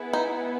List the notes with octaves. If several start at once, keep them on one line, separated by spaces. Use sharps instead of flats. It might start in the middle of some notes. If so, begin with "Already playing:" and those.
Already playing: B3 E4 G#4 B4
D#4